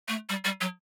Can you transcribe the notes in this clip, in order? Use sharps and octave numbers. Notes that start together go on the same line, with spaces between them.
A3
G3
G3
F#3